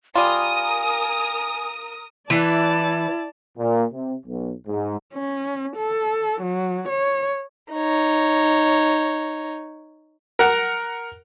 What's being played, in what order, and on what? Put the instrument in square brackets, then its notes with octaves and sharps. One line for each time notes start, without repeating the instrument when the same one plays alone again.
[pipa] G3 F4 [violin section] A#4 D#6 [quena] G#5
[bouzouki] E3 B4 [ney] E4 [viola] D5 A5
[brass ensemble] A#2
C3
B1
G#2
[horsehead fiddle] C#4
A4
F#3
C#5
[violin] D#4 C#5
[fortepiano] A#4 F#5